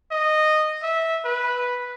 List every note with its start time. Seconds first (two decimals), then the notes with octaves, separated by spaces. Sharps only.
0.11 D#5
0.83 E5
1.25 B4